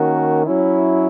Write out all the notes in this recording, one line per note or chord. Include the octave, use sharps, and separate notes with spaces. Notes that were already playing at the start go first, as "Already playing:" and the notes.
Already playing: D#3 A#3 C#4 F#4 A#4
F#3 C#4 E4